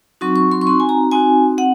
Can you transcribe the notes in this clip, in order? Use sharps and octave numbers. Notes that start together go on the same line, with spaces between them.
F#3 C4 D#4 F#4 C#6
C#6
C6
C#6
C4 D#4 F#4 C6
G#5
A#5
C4 D#4 F#4 G#5
C4 F#5